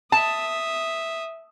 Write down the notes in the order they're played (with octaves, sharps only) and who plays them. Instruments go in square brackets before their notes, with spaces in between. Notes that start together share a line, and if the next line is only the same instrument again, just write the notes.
[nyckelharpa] E5 D#6 [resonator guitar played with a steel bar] A5